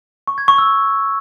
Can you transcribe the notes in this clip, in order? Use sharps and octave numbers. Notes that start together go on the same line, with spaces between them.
C#6
G#6
C#6
E6